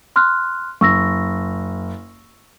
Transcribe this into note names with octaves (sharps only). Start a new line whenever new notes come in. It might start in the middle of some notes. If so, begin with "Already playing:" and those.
C6 F6 F#6
F#1 C#6 E6 A#6